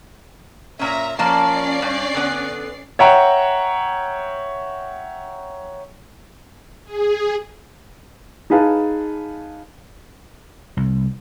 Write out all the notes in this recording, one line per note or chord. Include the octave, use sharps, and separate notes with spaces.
A#2 C#4 E5 A#5
F3 A#3 C#4 D5 A5 C7
G2
D3 B3
C#5 E5 F#5 G5 A#5
G#4
D#4 G#4 B4 F5 A5
C2